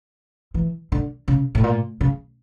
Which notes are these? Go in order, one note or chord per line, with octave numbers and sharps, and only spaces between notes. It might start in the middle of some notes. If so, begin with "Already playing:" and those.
E3
D3
C#3
A2
A#2
C#3